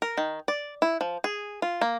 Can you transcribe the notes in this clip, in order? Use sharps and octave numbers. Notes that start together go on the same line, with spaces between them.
A#4
D#3
D5
E4
F3
G#4
F4
A#3